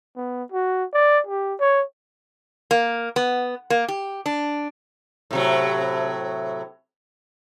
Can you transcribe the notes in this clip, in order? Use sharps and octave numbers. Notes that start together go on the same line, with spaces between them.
B3
F#4
D5
G4
C#5
A#3
B3
A#3
G4
D4
A2 C3 F#3